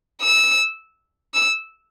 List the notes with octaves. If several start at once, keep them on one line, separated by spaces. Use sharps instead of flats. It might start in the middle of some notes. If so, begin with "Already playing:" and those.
E6
E6